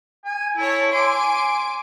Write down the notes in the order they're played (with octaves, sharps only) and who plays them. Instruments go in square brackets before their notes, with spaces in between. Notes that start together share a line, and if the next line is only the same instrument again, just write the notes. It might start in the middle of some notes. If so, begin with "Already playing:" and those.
[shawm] G#5
[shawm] E4 [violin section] A4 C#5
[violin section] G#5 D6 D7 [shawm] C6